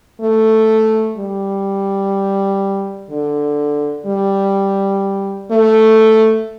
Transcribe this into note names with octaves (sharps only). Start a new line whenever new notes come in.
A3
G3
D3
G3
A3